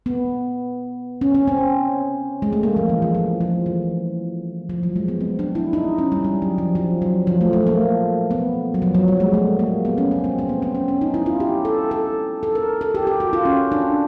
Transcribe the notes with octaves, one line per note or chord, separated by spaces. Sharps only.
B3
C#4
C#4
C4
G#3
A3
A#3
F3
E3
F3
F3
F3
E3
F3
F#3
G#3
B3
C4
D4
E4
D#4
C#4
G3
G3
F#3
F3
F3
F#3
F3
A3
A3
A#3
B3
F#3
F3
F#3
G3
G#3
A3
A#3
B3
C#4
C4
C4
C4
B3
C4
C#4
C#4
D#4
E4
F4
G4
A4
A4
A4
A#4
A4
G4
G4
F#4
F4
C#4
D4